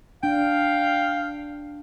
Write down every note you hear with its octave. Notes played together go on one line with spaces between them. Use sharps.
D4 F5 G5